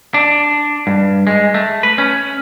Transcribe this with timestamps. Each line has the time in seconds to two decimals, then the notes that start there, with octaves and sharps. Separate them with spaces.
0.14 D4
0.87 G2
1.27 G#3
1.54 A3
1.83 B4
1.98 C#4